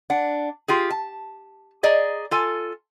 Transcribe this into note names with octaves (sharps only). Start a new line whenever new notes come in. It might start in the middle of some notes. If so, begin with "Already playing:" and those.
D4 F#5
F4 G4 G#4
A5
G#4 D5 D#5 A#5
F4 A4 G#5